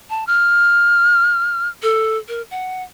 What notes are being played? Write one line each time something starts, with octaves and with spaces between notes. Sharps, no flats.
A5
F6
A4
A#4
F#5